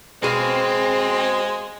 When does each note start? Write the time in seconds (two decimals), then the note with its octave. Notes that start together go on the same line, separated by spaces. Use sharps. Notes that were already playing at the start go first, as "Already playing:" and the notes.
0.23 B2 G#3 C4 G#4 C5 F5